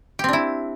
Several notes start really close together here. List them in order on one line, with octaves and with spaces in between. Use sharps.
G4 C4 D4 E4